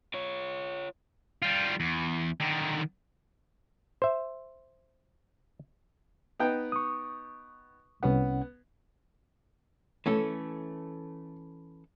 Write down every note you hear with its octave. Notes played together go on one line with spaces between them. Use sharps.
F4 C#5
G3 F4
E2
D3 D#3
C5 E5
B3 D#4 G5
C#6 D#6
C2 B3 C#4 F#5
E3 A3 C#4 A4